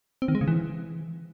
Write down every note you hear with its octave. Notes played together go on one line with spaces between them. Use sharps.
C4
D#3
G#3
C#3
E3